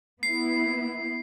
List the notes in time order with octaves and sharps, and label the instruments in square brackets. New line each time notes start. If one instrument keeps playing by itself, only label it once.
[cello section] B3 E4 [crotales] C7